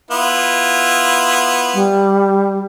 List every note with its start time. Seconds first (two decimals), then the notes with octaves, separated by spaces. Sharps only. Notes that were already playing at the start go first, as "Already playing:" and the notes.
0.11 B3 E4 F4
1.74 G3